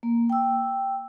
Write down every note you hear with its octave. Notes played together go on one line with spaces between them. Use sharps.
A#3
G5 E6